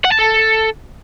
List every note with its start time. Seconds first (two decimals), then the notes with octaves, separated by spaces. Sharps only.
0.05 F#5
0.12 A5
0.19 A4